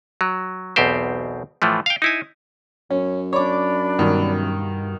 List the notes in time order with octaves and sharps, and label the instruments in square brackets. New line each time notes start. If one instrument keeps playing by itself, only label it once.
[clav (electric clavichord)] F#3
B1 E2 B2 C4 G4 C5
A2 E3 F3 A3
F5 G5
D#4 E4 G#5
[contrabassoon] F#2 [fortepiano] C#4
[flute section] D4 D5 B5 [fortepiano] C#5 D6
[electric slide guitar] G2 [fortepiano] B2 D#3